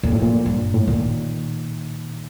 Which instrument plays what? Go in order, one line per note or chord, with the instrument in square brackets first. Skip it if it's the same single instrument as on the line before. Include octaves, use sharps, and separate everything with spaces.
[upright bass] F2 [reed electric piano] A#2
[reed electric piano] A2
A#2
[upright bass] G2
[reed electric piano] A2
[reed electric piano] A#2 [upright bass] D#3